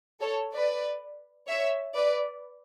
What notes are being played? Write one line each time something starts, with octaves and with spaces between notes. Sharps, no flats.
A4 C#5
B4 D5
C#5 E5
B4 D5